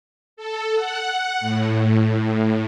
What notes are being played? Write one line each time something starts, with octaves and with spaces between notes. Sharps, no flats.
A4
F#5
A2